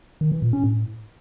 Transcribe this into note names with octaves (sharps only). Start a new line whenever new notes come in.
D#3
E3
A#2
C#4
A2